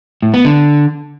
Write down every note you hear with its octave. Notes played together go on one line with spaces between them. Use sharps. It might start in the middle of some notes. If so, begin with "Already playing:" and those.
A2
B3
D3